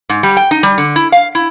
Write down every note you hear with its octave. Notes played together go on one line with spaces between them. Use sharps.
G#2
G3
G5
D#4
G3
D3
E4
F5
E4